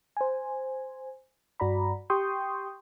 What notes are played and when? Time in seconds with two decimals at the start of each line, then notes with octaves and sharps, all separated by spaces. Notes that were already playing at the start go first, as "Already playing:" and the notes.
0.17 C5 G#5
1.60 G2 F#4 D5 A#5 B5
2.10 G4 G5 C6 C#6 D#6 G6